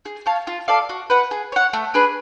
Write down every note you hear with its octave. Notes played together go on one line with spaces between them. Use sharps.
G#4
C#5 F5 A5
F4
A4 D5 F5
F#4
B4 F#5
G#4
C#5 F#5
A3
D4 G#4 B4